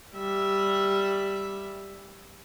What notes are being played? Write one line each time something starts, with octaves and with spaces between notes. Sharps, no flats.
G3 E5